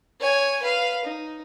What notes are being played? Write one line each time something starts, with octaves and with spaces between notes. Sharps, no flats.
C#5 G#5
B4 F5
D#4